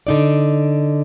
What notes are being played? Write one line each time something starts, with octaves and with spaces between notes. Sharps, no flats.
D3 D#4 D5